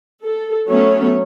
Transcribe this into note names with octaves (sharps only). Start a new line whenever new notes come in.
A4
F#3 A3 B3 C#4 C#5